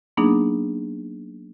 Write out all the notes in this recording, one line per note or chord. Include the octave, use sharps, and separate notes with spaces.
F#3 A#3 B3 D4 D#4 G#4